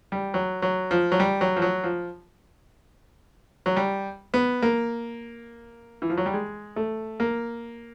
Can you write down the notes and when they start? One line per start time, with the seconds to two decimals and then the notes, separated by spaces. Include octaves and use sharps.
0.12 G3
0.34 F#3
0.62 F#3
0.91 F3
1.12 F#3
1.20 G3
1.41 F#3
1.56 F3
1.62 F#3
1.84 F3
3.66 F#3
3.77 G3
4.34 B3
4.62 A#3
6.02 E3
6.10 F3
6.17 F#3
6.26 G3
6.33 G#3
6.76 A3
7.20 A#3